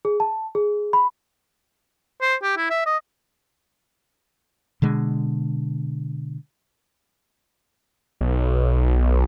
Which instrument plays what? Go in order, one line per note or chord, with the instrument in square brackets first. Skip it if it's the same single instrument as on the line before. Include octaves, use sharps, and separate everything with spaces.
[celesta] G#4
A5
G#4
B5
[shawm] C5
G4
E4
E5
D#5
[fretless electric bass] B2 D3 G#3
[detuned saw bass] B1